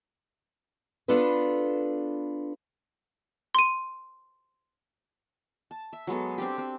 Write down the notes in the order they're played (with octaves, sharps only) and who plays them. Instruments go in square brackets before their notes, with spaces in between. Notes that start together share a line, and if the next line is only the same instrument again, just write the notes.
[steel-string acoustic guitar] B3 D4 F4 A4 B4
[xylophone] C6 D#7
[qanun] A5
E5
F#3 G#3 B3 A4
C4 D4 G4
C4